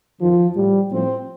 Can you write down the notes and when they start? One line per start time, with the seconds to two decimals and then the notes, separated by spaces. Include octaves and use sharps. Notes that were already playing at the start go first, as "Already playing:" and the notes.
0.20 F2 D#3 F3
0.54 A2 F3 G3
0.90 A2 F3 C4